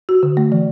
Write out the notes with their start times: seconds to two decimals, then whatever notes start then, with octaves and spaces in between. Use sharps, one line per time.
0.09 F#4
0.23 D3
0.37 A3
0.52 E3